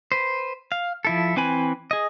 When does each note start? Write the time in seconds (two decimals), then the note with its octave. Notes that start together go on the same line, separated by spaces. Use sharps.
0.12 B4 C5
0.72 F5
1.05 F3 E4 A4
1.36 E3 C4 B4 G#5 B5
1.91 G#4 D#5